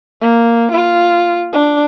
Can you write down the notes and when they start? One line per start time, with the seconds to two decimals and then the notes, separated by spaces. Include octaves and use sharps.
0.21 A#3
0.71 F4
1.52 D4